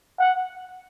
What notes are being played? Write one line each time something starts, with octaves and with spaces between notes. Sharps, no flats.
F#5